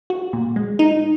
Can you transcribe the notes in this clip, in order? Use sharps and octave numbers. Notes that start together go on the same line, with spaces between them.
F#4
A#2
G#3
D#4